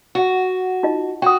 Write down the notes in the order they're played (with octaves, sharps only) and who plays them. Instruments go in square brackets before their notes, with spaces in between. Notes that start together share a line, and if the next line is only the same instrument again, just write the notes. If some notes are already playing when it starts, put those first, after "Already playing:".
[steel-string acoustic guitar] F#4
[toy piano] D#4 F4 D#5
[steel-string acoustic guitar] F#4 [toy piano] G5 D#6